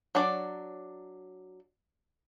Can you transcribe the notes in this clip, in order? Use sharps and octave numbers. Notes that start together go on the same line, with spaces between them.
F#3 D4 C#5 D5